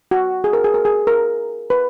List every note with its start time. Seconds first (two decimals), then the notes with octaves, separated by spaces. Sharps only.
0.11 F#4
0.44 G#4
0.53 A#4
0.64 G#4
0.74 A#4
0.85 G#4
1.07 A#4
1.70 B4